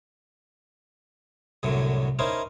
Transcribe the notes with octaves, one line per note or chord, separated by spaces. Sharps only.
C2 F#2 A2 D3 F#3
C#4 D#4 E4 A#4 C5